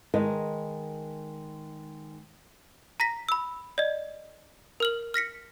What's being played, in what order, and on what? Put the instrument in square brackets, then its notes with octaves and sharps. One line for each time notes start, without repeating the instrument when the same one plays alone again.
[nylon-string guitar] D#3 G#3 A#4 B4 D#5 A5
[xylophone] A#5 A#6 B6
B5 E6
D5 D#5
A#4 F6 F#7
F6 A#6 B6 C#7